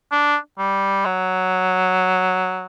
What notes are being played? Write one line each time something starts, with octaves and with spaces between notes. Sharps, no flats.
D4
G3
F#3